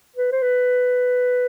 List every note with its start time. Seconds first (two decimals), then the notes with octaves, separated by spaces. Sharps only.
0.16 B4
0.32 C5
0.42 B4